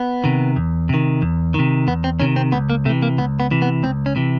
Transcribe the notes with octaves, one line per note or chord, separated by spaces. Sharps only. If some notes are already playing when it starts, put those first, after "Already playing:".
Already playing: B3
C3 D#3
E2
C3 D#3
E2
C3 D#3
E2 B3
C4
C3 D#3 C#4
C4
C#2 B3
A#3
C3 E3 A3
A#3
C#2 B3
B3
C3 E3
B3
C#2 C4
C#4
C3 E3